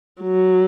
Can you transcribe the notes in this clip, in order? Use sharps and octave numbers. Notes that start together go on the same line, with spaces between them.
F#3